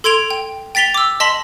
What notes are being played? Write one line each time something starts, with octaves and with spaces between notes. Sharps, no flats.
A4 C6 G#6 D7 F7
G5
G5 A6 B6 F7 G7
D6 E6
D#5 A5 C6 B6 F#7